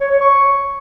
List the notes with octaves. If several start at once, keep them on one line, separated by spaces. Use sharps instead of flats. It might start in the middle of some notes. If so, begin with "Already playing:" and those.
C#5
C#5
C#6